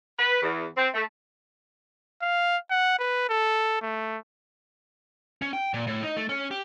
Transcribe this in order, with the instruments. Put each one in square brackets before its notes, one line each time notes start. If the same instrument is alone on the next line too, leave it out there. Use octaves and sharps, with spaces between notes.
[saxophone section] B4
E2
C4
A3
[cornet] F5
F#5
B4
A4
A3
[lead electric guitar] C#4
G5
A#2
A2
D#4
A3
C#4
G4